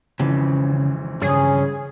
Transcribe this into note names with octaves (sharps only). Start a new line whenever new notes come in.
G#1 F2 C#3 E3
G2 C#3 C#4 G#4